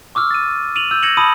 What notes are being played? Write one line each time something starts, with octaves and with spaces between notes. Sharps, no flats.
C#6 D6 E6 F6
A6 D#7
D#7 F7 F#7
E6 G6
G#6 A#6 C#7 E7 F#7
A5 B5 D#6 D#7